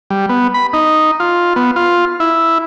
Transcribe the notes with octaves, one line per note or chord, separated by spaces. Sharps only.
G3
B3
B5
D#4
F4
B3
F4
E4